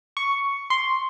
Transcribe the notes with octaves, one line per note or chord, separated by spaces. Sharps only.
C#6
C6